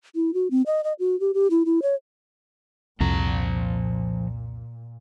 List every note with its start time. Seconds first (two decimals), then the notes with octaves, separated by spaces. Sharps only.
0.15 E4
0.34 F#4
0.51 C4
0.66 D#5
0.84 D#5
0.99 F#4
1.20 G4
1.34 G4
1.51 E4
1.65 E4
1.82 C#5
3.00 C2 F2 A#2 F3 A#5